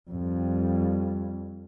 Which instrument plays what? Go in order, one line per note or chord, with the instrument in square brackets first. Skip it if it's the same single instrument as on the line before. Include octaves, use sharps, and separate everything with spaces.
[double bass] F2 G3